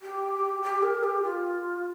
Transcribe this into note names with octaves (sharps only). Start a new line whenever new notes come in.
G4
G4
A#4
G4
F4